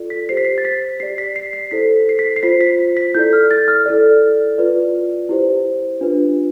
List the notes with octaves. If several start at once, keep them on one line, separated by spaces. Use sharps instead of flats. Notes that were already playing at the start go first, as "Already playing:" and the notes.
Already playing: F4 A4 D5
B6
G4 C5 C7
B6
C7
A6
B6
G4 D5 C7
B6
C7
C7
E4 A4 C5 B6
C7
B6
C7
F4 C5 B6
B6
B6
E4 A4 D5 G6
F6
A6
F6
E4 A4 D5
F4 B4 D5
E4 G4 C5
D4 F4 B4